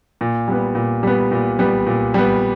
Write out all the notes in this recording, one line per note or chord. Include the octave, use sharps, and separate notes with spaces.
A#2
G3 B3
A#2
G3 B3
A#2
G3 B3
A#2
G3 B3